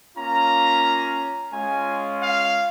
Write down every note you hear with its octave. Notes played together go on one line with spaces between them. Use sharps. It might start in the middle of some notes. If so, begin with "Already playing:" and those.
A#3 C#4 F4 A#5
G#3 C#4 F4 G#5
F5